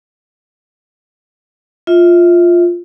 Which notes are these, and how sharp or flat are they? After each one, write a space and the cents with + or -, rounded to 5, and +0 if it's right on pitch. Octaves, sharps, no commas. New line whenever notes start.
F4 +0 E5 -30